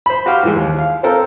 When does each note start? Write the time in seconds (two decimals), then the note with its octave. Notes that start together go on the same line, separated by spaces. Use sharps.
0.06 C5 B5
0.26 F#4 G4 F5 G5 F6
0.43 G#2 E3 G#3
0.56 D#2
0.79 F5
1.03 C4 F4 A4 A#4 G5